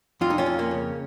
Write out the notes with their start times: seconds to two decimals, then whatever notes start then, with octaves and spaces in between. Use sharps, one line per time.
0.21 F2 F4
0.30 D#4
0.38 C#4 F4
0.46 F2
0.59 A#3 C#4
0.71 C#3